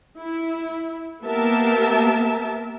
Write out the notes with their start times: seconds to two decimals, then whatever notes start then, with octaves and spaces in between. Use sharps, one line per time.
0.18 E4
1.23 A#3 B3 G4 A#4 E5 A5